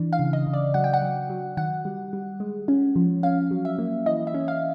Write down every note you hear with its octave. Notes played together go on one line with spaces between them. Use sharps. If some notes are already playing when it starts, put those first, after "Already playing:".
Already playing: E3 D4
F5
C#3
D#5
C#3
D5
F#3 F#5
G5
F#5
F#3
F#3
D#3 F#5
G3
G3
G#3
C#4
F3
C#4 F5
F#3
E5
A#3
E3 D#5
E5
C#4
F5